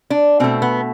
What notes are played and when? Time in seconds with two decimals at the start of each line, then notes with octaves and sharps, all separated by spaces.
0.10 D4
0.40 B2 A3 C4
0.62 B3